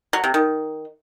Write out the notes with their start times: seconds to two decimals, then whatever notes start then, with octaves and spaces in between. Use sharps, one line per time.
0.13 F#3
0.24 C3
0.34 D#3